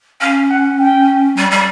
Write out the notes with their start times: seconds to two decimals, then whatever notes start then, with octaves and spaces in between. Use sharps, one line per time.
0.21 C#4 F5
0.50 F#5
0.79 G5
1.37 G3
1.51 G3